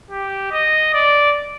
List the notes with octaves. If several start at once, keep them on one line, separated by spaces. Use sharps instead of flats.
G4
D#5
D5